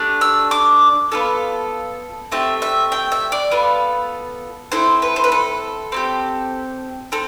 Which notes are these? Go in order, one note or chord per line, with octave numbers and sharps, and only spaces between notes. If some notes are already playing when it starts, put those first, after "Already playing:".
Already playing: A3 D4 G4
E6
D6
B3 F4 A4
A3 C4 G4 E5
E5
G5
E5
D5
B3 F4 A4
C4 E4 A4 C5
B4
C5
B4
A4
C4 E4 G4
C4 A4